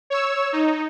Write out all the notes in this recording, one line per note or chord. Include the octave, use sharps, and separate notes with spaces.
C#5 E6
D#4